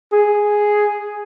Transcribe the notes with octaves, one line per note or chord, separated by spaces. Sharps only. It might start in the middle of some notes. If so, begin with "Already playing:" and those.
G#4